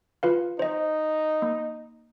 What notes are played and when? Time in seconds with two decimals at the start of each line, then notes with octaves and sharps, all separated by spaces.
0.23 F4 B4 F5
0.59 D#4 C5 D#5
1.42 A#3